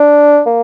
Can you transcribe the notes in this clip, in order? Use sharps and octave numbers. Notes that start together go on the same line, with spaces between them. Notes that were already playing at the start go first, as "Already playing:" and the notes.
Already playing: D4
A#3